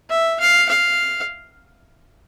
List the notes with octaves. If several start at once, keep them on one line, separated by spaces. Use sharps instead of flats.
E5
F5
F5